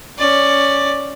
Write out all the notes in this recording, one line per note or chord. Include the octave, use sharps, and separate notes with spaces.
C#4 D5